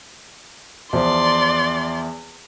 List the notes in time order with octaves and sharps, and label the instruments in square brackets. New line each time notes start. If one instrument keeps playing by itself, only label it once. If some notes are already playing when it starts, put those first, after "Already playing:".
[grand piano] E2 F3 [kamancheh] D5 C6